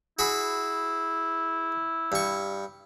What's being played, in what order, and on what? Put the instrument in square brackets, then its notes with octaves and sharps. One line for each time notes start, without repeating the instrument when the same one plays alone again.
[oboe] E4 [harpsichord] F#4 G#4 B5
[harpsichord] G2 C#6